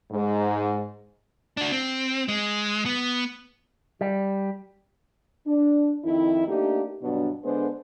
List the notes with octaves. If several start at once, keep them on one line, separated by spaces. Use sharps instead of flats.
G#2
D4 F#4
C4
G#3
B3
G3
D4
F2 D#3 D#4 E4
A3 A#3 D4 D#4 G4
G2 B2 F#3 B3 D4
D3 G#3 B3 D4 A4 C5